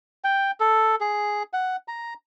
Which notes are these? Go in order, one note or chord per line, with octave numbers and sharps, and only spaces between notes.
G5
A4
G#4
F#5
A#5